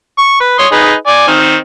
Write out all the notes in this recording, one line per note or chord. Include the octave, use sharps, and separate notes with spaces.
C#6
B4
C#5 C6 D#6
D#4 G#4 B4
D5 G#5
D#3 C4